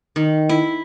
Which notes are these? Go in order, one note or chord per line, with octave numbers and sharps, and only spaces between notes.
D#3
E4